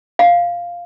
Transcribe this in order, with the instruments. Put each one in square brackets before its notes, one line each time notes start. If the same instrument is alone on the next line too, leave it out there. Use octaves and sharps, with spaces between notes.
[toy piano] F5